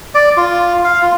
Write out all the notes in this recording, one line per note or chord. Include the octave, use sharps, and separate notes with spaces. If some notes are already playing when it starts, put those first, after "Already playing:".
D5
F4
F5
F4